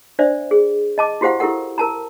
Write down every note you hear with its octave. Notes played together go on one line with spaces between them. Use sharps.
D4 C5 D5 E5
G#4
D#5 A5 D6
E4 F#4 G4 C5 F5 F#5
E4 G4 A4 A#4 F#5
A#4 A5 A#5